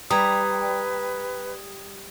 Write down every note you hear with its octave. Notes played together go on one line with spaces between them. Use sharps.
G3 B4 A#5 D#6 G#6